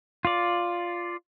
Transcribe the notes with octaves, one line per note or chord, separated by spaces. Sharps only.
F4 D5